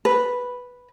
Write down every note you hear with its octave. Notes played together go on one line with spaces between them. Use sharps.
B4